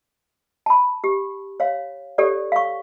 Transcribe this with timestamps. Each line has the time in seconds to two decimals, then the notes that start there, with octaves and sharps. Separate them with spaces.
0.66 A5 B5
1.04 G4
1.60 C#5 F5
2.18 G4 A4 C#5 D5
2.52 F5 C#6